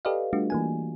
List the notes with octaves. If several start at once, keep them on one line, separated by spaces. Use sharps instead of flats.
G4 A4 B4 D5 D#5 F5
G3 A3 D4 F4 F#4
E3 A#3 G#5